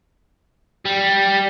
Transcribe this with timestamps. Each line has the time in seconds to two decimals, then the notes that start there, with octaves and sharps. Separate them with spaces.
0.85 G3